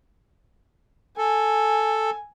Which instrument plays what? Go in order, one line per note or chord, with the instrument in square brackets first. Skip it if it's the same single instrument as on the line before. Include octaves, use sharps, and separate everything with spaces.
[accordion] A4 [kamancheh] G#5